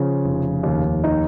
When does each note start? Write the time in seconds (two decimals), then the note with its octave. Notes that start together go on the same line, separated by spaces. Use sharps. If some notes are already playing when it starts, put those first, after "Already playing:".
Already playing: C#3 F3
0.25 F1
0.63 D#2
1.04 D#4